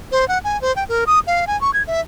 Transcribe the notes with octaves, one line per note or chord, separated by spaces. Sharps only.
C5
F#5
G#5
C5
G5
A#4
D#6
F5
G#5
C#6
G#6
E5